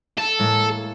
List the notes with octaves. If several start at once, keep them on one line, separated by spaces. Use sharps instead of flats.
A4
A2 G#3 A#3